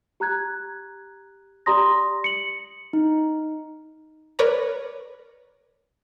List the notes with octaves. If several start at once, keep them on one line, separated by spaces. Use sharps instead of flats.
G4 A#5 F#6 G#6
G4 D5 A#5 C6 D#6 A#6
C#7 F#7
D#4
A#4 B4 C#5 D5 A#5